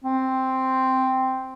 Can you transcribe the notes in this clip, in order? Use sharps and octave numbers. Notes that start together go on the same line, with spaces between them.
C4